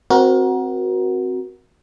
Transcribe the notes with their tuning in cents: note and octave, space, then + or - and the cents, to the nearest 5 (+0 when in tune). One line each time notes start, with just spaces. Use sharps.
C4 +0 F#4 +0 A#4 +25